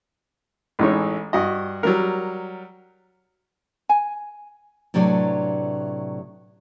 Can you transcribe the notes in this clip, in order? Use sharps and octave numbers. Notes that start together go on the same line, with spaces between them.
A1 E3 G#3 D#4 C#5
G2 F#4 D#5
F#3 G3 A#4
G#5
A2 C3 F#3 D4 B4 D5